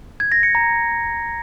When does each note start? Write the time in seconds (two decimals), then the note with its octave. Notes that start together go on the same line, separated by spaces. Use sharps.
0.20 G#6
0.32 A#6
0.43 C#7
0.55 A#5